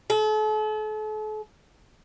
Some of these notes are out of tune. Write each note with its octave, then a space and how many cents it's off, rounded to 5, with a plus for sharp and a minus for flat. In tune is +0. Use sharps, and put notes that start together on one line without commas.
A4 -40